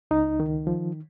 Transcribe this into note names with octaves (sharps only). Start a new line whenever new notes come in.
C#2 D#4
D#3
F3